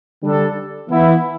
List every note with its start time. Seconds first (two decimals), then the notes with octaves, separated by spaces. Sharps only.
0.22 D3 G3 D4 A4
0.90 E3 B3 E4